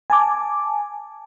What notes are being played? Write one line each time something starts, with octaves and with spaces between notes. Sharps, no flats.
G#5 A5 D6